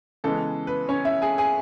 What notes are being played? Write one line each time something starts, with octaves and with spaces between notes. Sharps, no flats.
C#3 E3 G#3 B3 A4
B4
C#4 C#5
E4 E5
G#4 G#5
G#4 G#5